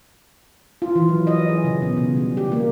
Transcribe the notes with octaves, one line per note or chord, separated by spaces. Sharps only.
F4
E3
F#3
D#5
G#4
C#3
B2
C#3
G3
G4
A#3